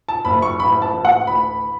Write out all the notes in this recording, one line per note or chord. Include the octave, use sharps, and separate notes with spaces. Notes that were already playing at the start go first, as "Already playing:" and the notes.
A5
F#1 B5
C#6
A1 B5
A5
A1
F#5
D2 B5